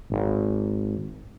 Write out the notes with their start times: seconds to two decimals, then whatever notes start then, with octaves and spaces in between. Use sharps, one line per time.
0.10 G#1